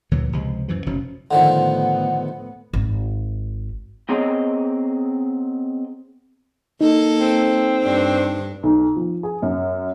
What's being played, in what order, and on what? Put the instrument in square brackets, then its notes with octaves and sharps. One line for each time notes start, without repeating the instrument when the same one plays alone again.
[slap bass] D2 A#2 E3 F#3
C#2 C3 F3 G#3
F#2 E3 F3
F1 B2 F3 C#4
[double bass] A2 B3 [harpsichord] D3 D#3 F3 [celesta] F#5
[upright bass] G#1
[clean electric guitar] B3 C4 G#4 C#5 D#5 G5
[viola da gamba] A#3 A4 [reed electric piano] D#4
[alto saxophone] C4
[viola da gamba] G2 D4
[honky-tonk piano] B1
F3
G#4
F#2